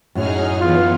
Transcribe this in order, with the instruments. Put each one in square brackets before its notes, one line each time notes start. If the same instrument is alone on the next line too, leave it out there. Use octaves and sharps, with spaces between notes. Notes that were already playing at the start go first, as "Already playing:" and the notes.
[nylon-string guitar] F#2 A2 F#3 [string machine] D#4 G#4 F6
[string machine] E3 B3 [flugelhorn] F4